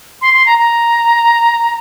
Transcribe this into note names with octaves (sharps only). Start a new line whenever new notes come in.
C6
C6
A#5
A#5